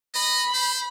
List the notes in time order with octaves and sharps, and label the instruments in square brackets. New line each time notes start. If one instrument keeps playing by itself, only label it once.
[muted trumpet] D#5 [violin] B5
[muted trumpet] C5